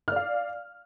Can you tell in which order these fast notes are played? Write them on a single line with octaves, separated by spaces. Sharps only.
F6 D5 F5